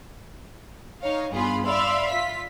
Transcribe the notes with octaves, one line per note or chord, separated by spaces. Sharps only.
D#4 C#5 F5
G2 B3 F4 G#4 B5 C6
D5 E5 F5 B5 C6
F4 B6